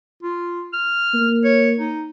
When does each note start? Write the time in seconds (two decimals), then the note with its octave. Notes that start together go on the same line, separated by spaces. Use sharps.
0.23 F4
0.73 F6
1.14 A#3
1.44 C#5
1.78 D#4